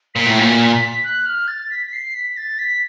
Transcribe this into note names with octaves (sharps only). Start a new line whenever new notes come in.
A#2 B6
A2
A#2 B6
B6
B6
F#6
F6
A6
B6
B6
C7
B6
A6
B6